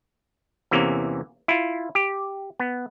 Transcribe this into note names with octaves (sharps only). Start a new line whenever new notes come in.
E2 C3 E3 A#3 C#4
E4 F4
G4
B3